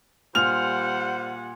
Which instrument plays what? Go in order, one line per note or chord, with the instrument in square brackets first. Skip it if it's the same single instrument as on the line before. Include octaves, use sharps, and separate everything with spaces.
[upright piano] A#2 F7 [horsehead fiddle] G3 F#5 [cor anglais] C5 [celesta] F6